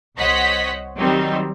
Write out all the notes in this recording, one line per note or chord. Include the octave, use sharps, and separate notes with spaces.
C2 C5 C#5 D#5 F#5 B6
D#3 F#3 G3 C4 D#4